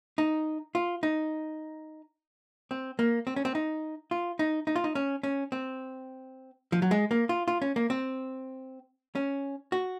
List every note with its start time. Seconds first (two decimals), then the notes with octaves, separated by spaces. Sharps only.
0.18 D#4
0.75 F4
1.03 D#4
2.71 C4
2.99 A#3
3.27 C4
3.36 C#4
3.45 C4
3.55 D#4
4.11 F4
4.39 D#4
4.67 D#4
4.76 F4
4.84 D#4
4.95 C#4
5.23 C#4
5.52 C4
6.72 F3
6.82 F#3
6.91 G#3
7.11 A#3
7.29 F4
7.48 F4
7.62 C#4
7.76 A#3
7.90 C4
9.15 C#4
9.72 F#4